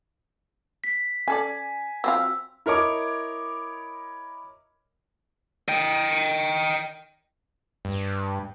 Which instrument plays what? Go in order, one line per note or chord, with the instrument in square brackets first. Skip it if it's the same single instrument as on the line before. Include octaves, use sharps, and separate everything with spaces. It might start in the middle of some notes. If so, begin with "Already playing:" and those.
[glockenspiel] B6
[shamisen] C#4 A4 D5 [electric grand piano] G#5
[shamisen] F#3 C4 F4 [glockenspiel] E6
[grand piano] E4 A#4 C#5 D#5 D6
[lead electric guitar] D#5 G5
[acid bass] G2